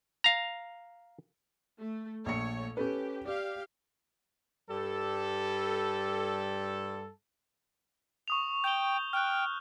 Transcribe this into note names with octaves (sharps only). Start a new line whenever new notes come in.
F5 A#5
A3
A#1 A3 C#5 C#7
C#4 G4 A4 B4
G4 D5 F5
G2 G3 A4
C#6 D#6 F7
G5 G6 G7
G5 F6 F#6